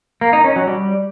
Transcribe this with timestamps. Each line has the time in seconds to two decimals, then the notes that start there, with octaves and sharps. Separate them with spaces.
0.21 A#3
0.33 D#4
0.44 C#4
0.56 F#3
0.67 G3